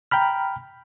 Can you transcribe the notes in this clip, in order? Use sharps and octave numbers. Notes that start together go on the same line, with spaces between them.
G5 A#5 B5 F6